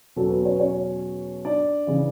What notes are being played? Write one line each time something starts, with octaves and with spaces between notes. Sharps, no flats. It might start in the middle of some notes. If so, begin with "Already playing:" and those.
E2 B2 F#3 C#4 A4
B3 B4
C#4 C#5
C#4 C#5
D4 D5
C#3 E3